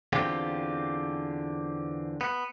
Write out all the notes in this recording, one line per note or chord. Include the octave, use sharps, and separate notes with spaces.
E2 D3 C4 F4 G4
B3